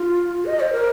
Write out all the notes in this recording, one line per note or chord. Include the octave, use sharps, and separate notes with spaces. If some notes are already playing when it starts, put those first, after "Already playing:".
Already playing: F4
D#5
C5
A#4